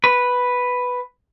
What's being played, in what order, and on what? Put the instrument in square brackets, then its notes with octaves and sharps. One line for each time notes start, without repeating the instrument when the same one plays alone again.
[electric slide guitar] B4